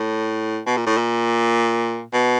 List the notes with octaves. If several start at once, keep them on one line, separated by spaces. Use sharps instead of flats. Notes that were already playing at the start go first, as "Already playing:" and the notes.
Already playing: A2
B2
A#2
A2
A#2
B2